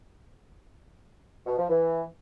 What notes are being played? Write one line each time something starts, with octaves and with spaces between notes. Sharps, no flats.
B2
F3
E3